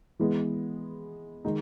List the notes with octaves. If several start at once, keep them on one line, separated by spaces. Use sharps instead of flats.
E3 G#3 B3
D#3 G#3 D#4